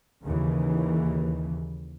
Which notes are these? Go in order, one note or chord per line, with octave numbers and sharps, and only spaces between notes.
D#2 C#3 E3